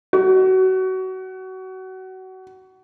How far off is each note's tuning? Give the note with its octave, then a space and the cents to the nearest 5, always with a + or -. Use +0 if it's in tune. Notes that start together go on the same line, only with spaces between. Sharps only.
F#4 +25